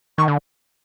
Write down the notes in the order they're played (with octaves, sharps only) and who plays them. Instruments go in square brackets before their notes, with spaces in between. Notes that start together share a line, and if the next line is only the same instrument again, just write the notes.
[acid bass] D#3 [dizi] C#6
[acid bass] D3